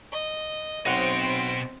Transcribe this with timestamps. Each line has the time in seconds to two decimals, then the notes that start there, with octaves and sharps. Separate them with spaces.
0.12 D#5
0.86 B1 B2 C4 C5 C#5 D#5 F#5 D7